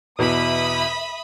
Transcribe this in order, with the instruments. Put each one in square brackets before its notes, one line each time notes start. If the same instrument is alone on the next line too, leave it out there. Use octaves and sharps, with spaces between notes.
[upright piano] E2 B2 [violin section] E5 B5 D#6